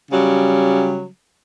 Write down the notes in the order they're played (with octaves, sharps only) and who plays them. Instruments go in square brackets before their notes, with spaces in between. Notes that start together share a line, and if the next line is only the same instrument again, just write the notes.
[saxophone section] C#3 F#3 G3